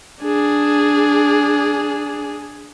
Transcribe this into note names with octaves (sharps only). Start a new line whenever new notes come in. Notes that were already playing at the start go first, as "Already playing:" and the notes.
D4 G#4